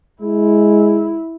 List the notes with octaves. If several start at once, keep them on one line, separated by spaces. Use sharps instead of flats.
G#3 E4